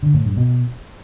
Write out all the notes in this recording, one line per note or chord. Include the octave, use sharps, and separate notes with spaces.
D3
A2
G2
B2